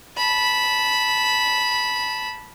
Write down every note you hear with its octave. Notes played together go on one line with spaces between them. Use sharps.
A5 B5